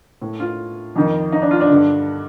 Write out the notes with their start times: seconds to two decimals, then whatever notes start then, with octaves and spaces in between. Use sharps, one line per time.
0.21 A2
0.40 F4
0.96 F2 D#3
1.32 D#4
1.42 D4
1.51 F4
1.61 D4
1.70 G2 D3